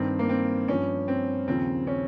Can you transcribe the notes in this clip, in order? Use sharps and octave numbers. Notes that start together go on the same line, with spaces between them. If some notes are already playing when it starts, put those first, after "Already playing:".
Already playing: G2 D#3 C4
A#3
C4
G2 F3 C#4
C4
D#2 C#3 F3 C4
C#4